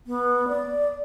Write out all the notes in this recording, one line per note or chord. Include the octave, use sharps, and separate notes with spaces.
B3
D5